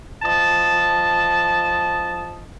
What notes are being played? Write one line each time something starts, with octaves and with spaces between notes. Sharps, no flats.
F3 D#5 A5